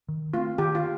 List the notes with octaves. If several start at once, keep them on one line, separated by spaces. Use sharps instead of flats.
D#3
A3 C4 F4
D#3 G4
F4